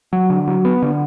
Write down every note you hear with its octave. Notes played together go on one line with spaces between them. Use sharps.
F#3
D3
F#3
B3
D3